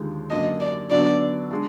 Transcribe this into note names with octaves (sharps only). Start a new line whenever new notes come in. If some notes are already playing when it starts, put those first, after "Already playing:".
Already playing: D#2 D3 F3 G#3
F#2 D3 F#3 A#3 D4 D#5
D5
D3 F#3 B3 D4 D5
G#3 D4